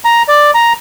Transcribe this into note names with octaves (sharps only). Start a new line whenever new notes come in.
A#5
D5
A#5